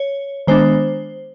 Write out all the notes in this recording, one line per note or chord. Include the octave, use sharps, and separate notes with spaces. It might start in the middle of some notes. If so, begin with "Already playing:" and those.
Already playing: C#5
D#3 G#3 B3 D4 C5